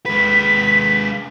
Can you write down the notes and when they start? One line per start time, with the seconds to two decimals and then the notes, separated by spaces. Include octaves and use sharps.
0.06 G#3 B4 B6